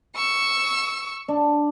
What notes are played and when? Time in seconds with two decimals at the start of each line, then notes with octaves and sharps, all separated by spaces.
0.15 C#6 E6
1.28 D4